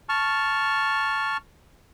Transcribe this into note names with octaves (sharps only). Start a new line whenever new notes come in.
A5 C#6 F6